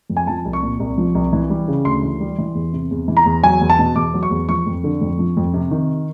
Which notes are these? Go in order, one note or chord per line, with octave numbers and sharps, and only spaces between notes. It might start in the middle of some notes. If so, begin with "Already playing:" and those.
F2
G#5
F3 A5
C2
C#6
A#2
C2
F3
C2
E3
G3
C#3
D2 C6
E3
G3
E3
E2
C3
E2
E3
A#5
E2
F#3 G#5
E2
A5
B2
E2 D6
F#3
C#6
E2
F3 C#6
F2
D3
F2
F3
F2
C3
D#3